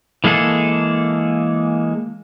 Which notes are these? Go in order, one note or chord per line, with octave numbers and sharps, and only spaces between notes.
E3 G#3 A#3 G#4 A4